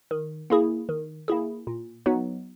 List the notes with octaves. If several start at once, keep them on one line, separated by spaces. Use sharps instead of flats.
D#3
A#3 E4 G#4
D#3
A#3 E4 G#4
A#2
F#3 B3 D#4 F#4